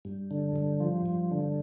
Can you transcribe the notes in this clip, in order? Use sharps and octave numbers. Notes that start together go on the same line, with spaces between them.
G2
D3
G2
F3
G2
D3